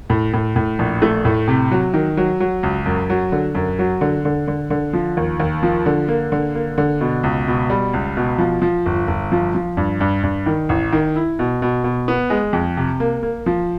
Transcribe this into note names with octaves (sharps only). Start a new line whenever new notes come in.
A2
A2
A2
A#1
A3
A2
C3
F#3
D#3
F#3
F#3
C#2
F#2
F#3
D3
F#2
F#3
D3
D3
D3
D3
F3
D#2
D#2
F3
D3
A#3
D3
A#3
D3
B2
C#2
B2
G3
C#2
B2
F3
F3
G1
G1
F3
F3
G2
G2
G2
D#3
A1
D#3
E4
B2
B2
B2
B3
G#3
F2
C3
A#3
A#3
F3